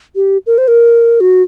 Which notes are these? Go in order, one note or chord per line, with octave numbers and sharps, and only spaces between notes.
G4
A#4
C5
A#4
F#4